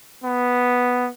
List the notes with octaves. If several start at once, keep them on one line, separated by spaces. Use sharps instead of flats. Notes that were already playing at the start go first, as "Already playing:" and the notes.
B3